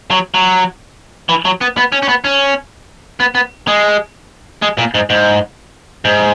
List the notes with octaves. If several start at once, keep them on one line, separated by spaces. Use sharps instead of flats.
F#3
F#3
E3
F#3
B3
B3
C#4
C#4
B3
C#4
B3
B3
G#3
G#3
A#2
G#2
G#2
G#2